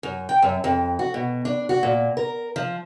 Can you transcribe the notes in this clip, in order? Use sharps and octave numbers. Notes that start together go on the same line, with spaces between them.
F#2
G5
F#2
F2
F#4
B2
D4
F#4
A#2
A#4
F3